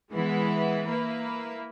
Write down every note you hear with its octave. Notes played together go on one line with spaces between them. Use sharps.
E3 G#3 B3 E4
A#3 E4 B4